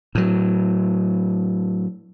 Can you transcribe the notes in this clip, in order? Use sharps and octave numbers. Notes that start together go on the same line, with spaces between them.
A2 F#3